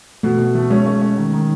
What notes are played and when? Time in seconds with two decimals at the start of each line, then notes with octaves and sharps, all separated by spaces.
0.23 B2 A3
0.39 B2
0.55 A3
0.70 G#3 C#4
0.86 C#4
1.02 C#4
1.17 D#3
1.33 D#3